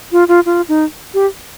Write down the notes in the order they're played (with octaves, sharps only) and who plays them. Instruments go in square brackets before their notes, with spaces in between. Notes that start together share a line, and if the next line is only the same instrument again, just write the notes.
[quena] F4
F4
F4
D#4
G4